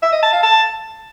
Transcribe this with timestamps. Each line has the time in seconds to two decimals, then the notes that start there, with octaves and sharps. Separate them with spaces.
0.02 E5
0.12 D#5
0.23 A5
0.33 F5
0.43 A5